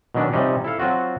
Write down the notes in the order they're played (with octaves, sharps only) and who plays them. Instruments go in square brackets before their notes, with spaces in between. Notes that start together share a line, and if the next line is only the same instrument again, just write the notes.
[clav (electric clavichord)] B2 D#3 F#3 C#4 D4
C3 F3 G3 C#4 D#4
E4 A4 F5
F#3 C4 F4 F#4